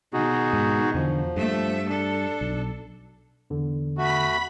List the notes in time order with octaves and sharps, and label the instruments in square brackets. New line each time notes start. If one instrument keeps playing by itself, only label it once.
[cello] B2 D#3 [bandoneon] D#4 F#4 G#4
[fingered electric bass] G#2
[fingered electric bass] E2 D3 [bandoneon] F3
[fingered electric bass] G2 [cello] A3 E5
[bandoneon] D4 [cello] A4
[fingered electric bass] B1
[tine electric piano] E2 D3
[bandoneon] A3 F#4 [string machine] B5 B6